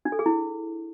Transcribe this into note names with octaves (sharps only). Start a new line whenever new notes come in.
D4
A4
G#4
E4